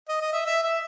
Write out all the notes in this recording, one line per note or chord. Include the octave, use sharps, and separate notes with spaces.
D#5
D#5
E5
E5
E5